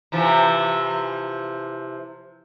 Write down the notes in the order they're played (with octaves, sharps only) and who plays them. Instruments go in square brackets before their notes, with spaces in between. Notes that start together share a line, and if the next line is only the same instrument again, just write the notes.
[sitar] C3 E3 F3